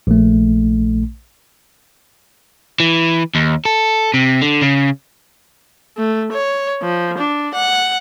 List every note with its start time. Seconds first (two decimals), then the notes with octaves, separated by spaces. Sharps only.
0.07 A#1 A3
2.80 E3
3.35 D#2
3.65 A4
4.14 C3
4.41 D3
4.61 C#3
5.97 A3
6.33 C#5
6.82 F3
7.18 D4
7.54 F#5